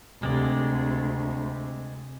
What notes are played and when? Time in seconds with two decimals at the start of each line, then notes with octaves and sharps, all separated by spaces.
0.23 D2 C3 G#3 C4 D5